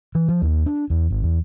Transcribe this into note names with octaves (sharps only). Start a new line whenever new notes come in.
E3
F3
D#2
D4
E2
G#1
E2